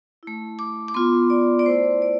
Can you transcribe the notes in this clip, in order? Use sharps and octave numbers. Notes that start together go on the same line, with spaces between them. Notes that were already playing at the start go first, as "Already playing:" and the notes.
A3 E4
D6
D6
B3 F4 C6
D5
D5
A3 E4 C5
D5